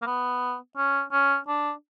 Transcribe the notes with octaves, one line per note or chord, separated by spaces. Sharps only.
A#3
B3
C#4
C#4
D4